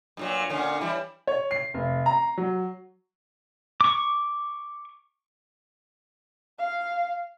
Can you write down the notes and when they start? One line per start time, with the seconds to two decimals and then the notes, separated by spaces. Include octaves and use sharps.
0.17 G2 A#2 F#3
0.50 A#2 D3 C#4
0.81 E3 G3 E4
1.27 C#5
1.51 C7
1.74 F1
2.06 A#5
2.38 F#3
3.81 C#6 D6
6.59 F5